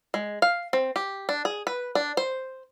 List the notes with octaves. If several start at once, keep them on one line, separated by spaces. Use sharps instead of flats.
G#3
F5
C4
G4
D4
G#4
B4
D4
C5